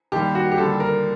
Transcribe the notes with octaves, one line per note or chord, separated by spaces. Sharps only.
D#2 D#3 G3 G4
F#4
G4
D#2 D3 G3 A4
A#4